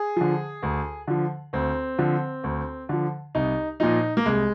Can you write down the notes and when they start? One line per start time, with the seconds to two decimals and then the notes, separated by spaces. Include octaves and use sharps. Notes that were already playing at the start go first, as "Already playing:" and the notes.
Already playing: G#4
0.16 D3 F3
0.63 D2
1.07 D3 F3
1.53 D2 C4
1.99 D3 F3
2.44 D2
2.89 D3 F3
3.35 C2 D#4
3.80 A#2 F3 D#4
4.17 A#3
4.25 C2 G#3